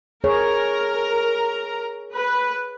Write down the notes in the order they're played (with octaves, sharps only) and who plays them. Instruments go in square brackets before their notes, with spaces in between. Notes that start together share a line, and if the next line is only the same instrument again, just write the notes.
[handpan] G#4 C#5 [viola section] A#4 A#5
[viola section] B4